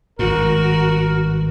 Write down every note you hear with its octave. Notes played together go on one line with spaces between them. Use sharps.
G#1 G2 F#4 A#4